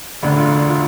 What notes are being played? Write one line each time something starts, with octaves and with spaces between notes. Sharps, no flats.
E1 D2 D3 D5
F4
F4